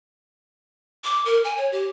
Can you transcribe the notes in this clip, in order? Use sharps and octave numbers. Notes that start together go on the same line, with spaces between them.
D6
A#4
G#5
C#5
G4